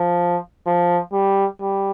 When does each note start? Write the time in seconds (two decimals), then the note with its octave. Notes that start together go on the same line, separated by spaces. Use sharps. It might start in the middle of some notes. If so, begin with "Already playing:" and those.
Already playing: F3
0.66 F3
1.13 G3
1.60 G3